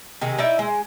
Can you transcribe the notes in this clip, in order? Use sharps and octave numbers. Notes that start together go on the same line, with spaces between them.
C3 D#3 G#4
D#4 E4 D5 E5
G#3